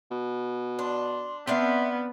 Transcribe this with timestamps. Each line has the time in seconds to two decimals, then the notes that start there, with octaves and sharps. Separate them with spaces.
0.11 B2
0.79 D4 C6
1.47 B3 C4 D4 E5 F5